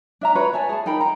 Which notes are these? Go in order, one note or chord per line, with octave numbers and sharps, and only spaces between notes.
D4 E5 A#5
F#4 B4 C#5 B5
C#5 E5 G#5 A5
G#4 A5
D#4 A#4 G5 B5
A#5